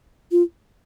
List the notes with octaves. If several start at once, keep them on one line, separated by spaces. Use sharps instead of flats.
F4